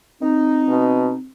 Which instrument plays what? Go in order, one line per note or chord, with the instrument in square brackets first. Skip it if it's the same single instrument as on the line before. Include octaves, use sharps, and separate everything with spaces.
[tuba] C4 [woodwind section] D#4
[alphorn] B2